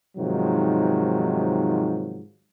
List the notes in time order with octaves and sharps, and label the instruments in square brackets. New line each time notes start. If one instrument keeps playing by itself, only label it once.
[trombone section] G#2 C3 D#3 F3 F#3